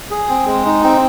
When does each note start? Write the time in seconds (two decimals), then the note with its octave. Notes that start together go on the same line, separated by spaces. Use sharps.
0.11 G#4
0.29 C4
0.47 G#3
0.65 D#4
0.84 C4